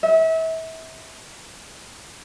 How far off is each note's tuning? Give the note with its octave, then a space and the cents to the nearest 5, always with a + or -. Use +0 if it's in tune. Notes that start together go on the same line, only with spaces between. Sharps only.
E5 -35